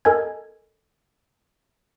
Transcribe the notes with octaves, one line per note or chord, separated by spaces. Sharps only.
A4 A#4 D#5 G#5 G#6